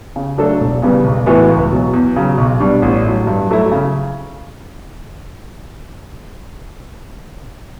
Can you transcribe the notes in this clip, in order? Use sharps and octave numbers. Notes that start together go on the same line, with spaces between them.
C#3
F#3 A3 D4 A4
E1
E2 C#3 G3 B3
B1
A2 E3 B3 F#4
C#2
B2 F#3
E2
C#3 F#3
B1
B2 G3 D4
A1
A2 F#3
G2
F#3 A3 E4
C#3